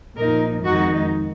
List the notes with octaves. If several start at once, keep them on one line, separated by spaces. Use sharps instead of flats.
A#2 F3 A#3 D#4 A#4
F2 D#3 G#3 D#4 F#4